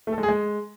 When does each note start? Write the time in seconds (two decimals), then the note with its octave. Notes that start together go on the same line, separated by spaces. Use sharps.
0.07 A3
0.12 A4
0.18 G#3
0.23 G#4
0.28 G#3